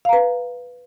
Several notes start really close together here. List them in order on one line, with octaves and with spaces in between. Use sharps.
F5 A#5 B4